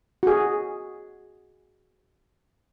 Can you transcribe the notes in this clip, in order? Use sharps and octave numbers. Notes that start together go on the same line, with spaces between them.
F#4 G#4